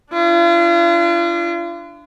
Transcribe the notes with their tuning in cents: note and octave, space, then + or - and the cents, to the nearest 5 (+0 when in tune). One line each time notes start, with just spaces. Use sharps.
D4 +0 F4 -40